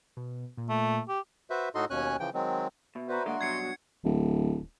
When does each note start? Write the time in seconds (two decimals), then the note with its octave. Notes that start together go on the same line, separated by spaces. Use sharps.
0.17 B2
0.57 A#2
0.69 A3
1.08 G4
1.50 F#4 B4 C5 E5
1.75 A2 D#4 F#4 A4 D#5 C6
1.90 D#2 B2 C#4 C#5 G#5 F#6
2.19 C#3 E3 F3 G5
2.34 D#3 F#3 G#3 C4
2.96 B2 E5
3.09 F#4 B4 C5 D5 E5 A#5
3.26 D2 G#3 A#3 D4 F#4 F#5 C6
3.41 G2 B2 F#3 G#6 C7 C#7
3.62 F#4
4.04 D1